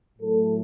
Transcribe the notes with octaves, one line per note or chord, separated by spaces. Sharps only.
A2 F#3 A3 A4